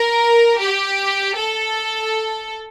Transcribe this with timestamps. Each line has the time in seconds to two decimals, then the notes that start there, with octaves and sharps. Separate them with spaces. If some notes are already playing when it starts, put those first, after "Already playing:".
Already playing: A#4
0.61 G4
1.36 A4